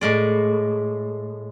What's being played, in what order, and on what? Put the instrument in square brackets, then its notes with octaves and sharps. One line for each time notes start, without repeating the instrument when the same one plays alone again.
[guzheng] A2 G#3 D5